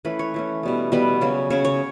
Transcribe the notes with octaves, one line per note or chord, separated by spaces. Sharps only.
E3 A3 C#4 B4
C#5
E3 A3 C#4
B2 G3 B3
B2 G3 B3 B4
C#3 F#3 C#4
C#3 F#3 C#4 C#5
C#5